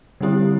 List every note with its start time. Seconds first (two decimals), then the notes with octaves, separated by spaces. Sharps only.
0.21 D3 G3 C4 E4 G4